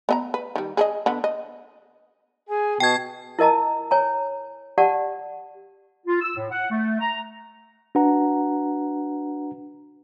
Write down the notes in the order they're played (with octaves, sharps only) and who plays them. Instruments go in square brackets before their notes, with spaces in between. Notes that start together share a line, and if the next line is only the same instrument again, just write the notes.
[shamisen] B3 D#5 A#5
B4
D#3 G3
G#4 A4 D#5
D3 B3
D#5
[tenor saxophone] G#4 [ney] G#5
[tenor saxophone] B2 [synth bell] G5 G#6 [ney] A5
[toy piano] E4 A#4 D#5 A5 A#5
C#5 G#5 A#5
G4 D5 F#5 A5
[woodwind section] F4
E6
A2
F#5
A3
A#5
[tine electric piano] D4 F#4 B4 F#5 A#5